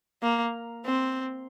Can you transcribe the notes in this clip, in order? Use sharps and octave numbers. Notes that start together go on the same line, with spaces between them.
A#3
C4